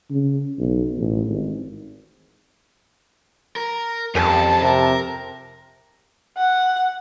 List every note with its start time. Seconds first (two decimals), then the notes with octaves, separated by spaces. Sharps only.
0.11 C#3
0.58 B1
0.97 A1
1.27 G#1
3.56 A#4
4.15 F2 C#4 G4 A5
4.62 C3 A#4
6.38 F#5